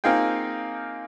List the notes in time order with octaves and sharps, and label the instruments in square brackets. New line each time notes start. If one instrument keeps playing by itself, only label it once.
[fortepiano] A#3 C4 D#4 F4 G#4 G5